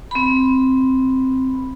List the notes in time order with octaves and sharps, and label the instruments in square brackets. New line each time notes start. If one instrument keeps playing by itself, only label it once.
[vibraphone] C4 B5